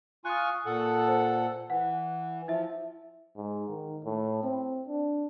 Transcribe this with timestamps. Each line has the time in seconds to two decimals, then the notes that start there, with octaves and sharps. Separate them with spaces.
0.25 F4 G#5 C#6 D#6 F#6
0.66 A#2 A4 F#5
1.08 C5
1.70 E3 F#5
2.48 F3 E4 E5
3.36 G#2
3.69 D#3
4.04 A2
4.43 C4
4.88 D4